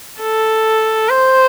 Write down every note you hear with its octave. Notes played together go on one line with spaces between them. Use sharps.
A4
C5